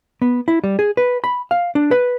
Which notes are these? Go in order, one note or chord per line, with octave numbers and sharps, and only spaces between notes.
B3
E4
G3
G#4
B4
B5
F5
D4
B4